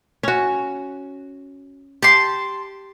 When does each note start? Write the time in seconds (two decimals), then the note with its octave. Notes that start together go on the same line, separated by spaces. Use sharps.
0.23 C#4 F#4
2.03 G4 A5 C6